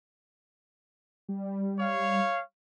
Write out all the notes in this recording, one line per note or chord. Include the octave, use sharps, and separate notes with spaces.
G3
C#5 F5